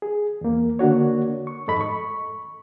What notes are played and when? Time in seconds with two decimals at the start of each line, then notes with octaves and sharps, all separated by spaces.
0.02 G#4
0.41 E2 A#3
0.79 D3 A#3 D4 F#4 C#5
1.47 C#6
1.67 F2 G#2 A4 D#5 B5
1.81 C#6